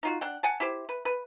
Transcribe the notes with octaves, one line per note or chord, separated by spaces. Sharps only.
D#4 F4 F#4
D4 F#5 G5
F#5 G#5 A5
E4 G4 C5
B4
B4